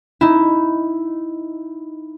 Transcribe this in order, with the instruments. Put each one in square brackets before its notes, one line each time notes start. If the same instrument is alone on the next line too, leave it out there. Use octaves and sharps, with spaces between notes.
[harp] D#4 E4